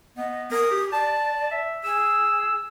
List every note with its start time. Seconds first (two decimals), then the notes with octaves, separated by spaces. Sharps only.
0.18 B3 D#5
0.52 A#4 D#6
0.71 G4
0.92 D5 A5
1.51 E5
1.84 G#4 E6